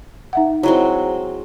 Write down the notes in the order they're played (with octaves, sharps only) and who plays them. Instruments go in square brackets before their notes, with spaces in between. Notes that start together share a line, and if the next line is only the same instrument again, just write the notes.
[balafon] D#4 E5 F#5
[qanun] F#3 G#3 C4 [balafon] E4